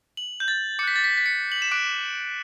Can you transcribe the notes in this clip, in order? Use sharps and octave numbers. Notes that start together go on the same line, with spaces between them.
F#7
G6
A6
D6 F#6 B6 C#7
A6
B6
B6
C#7
F#7
E7
D6 F#6 D7